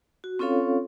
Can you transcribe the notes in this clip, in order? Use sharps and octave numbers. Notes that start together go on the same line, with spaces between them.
F#4
C4 C#4 F4 A4 C#5 F5